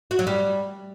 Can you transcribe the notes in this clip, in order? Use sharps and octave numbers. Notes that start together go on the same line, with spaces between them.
F#4
F#3
G3